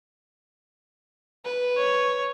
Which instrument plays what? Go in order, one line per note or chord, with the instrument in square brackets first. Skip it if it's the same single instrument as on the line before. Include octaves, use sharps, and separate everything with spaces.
[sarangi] B4
[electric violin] C#5